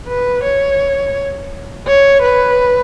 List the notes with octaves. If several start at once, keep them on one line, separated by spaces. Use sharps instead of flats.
B4
C#5
C#5
B4